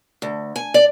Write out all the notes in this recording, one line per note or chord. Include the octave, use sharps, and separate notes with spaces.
D2
G#5
D5